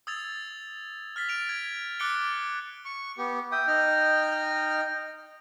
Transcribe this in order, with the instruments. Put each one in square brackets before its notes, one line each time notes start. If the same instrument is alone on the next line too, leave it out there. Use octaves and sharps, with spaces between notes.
[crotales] D#6 E6 G#6 A6 F7
F6 A6 B6
D7 F7
G#6
D6 F#6 A6 C#7 D7 G7
[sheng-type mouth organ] C#6
B3 G4
[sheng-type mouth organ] E5 D#6 [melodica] G5
[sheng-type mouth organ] D#4 D#5 F6